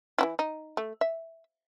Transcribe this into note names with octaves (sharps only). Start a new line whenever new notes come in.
E3 D#4 E4
D#4
A3
E5